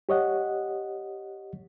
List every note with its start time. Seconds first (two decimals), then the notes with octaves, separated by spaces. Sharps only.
0.09 G4 C#5 D#5 F#5